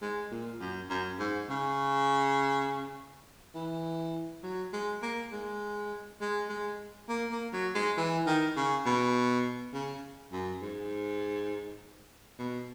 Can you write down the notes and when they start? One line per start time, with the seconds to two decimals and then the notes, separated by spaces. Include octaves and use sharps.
0.01 G#3
0.31 A#2
0.60 F#2
0.90 F#2
1.19 G#2
1.49 C#3
3.55 E3
4.43 F#3
4.73 G#3
5.02 A#3
5.32 G#3
6.20 G#3
6.49 G#3
7.09 A#3
7.31 A#3
7.53 F#3
7.75 G#3
7.97 E3
8.26 D#3
8.56 C#3
8.86 B2
9.73 C#3
10.32 F#2
10.62 G#2
12.38 B2